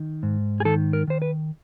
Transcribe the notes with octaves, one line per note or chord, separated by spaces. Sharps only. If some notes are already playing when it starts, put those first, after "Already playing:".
Already playing: D#3
G#2
G#4
D#3 A4
A#4
D#3 C5
B4